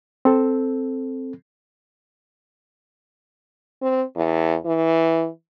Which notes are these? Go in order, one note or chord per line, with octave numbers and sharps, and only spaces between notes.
C4 A4
C4
E2
E3